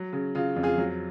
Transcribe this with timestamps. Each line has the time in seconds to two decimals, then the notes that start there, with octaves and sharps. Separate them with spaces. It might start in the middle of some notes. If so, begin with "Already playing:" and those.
Already playing: F#3
0.13 C#3
0.35 C#3 F4
0.56 F2
0.63 F4 G#4
0.78 F#3